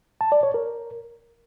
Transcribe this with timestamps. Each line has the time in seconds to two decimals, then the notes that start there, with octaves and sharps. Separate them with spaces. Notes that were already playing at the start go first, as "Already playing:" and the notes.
0.21 A5
0.32 D5
0.43 C#5
0.54 A#4